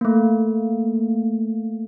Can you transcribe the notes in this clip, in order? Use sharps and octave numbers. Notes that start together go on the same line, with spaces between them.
A3 A#3